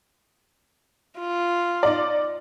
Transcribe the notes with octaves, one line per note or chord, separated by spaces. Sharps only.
F4
D#4 D5